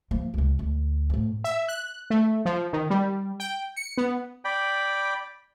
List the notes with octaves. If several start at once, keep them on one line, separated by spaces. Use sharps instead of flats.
F3 A#3
C#2 C#3
D2
F2 A2
E5
F#6
A3
F3
D#3
G3
G5
C#7
B3
D5 G5 B5